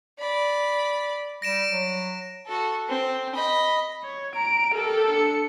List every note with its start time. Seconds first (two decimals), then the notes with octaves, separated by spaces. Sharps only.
0.20 D5 B5
1.42 G3 A#6 D7 E7
1.72 F#3
2.47 F#4 A4
2.88 C4
3.35 D#5 B5
4.04 C#5
4.35 A#5 D7
4.75 G4 A4 A#4
5.11 D4 C#7